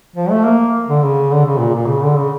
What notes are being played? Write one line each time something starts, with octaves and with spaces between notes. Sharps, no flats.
F3
A3
A#3
D3
C#3
D3
C#3
A#2
A#2
C#3
D3
C#3